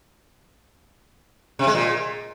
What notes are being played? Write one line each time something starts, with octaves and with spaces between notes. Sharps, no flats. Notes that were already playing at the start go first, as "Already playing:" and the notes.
C3
G#3
A#2